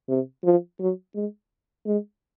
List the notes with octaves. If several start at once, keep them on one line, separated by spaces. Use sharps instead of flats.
C3
F3
F#3
G#3
G#3